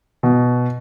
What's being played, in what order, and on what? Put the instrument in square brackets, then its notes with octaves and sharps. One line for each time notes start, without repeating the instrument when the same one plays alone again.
[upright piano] B2